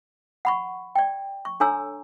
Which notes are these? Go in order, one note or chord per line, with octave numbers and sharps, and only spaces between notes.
F#5 B5 C#6
D5 G5
C#6
D4 A4 C#5 G#5 A#5 E6